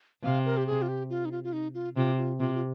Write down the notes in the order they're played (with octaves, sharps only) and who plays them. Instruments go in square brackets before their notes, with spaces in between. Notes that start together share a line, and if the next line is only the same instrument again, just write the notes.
[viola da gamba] C3 [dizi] F5
[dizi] A#4
G4
G#4
F4
G4
F4
D#4
F4
F4
D#4
F4
[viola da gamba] C3 [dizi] F4
[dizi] F4
[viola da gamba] C3 [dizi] F4
[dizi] F4